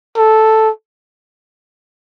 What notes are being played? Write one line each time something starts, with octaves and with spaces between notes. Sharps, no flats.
A4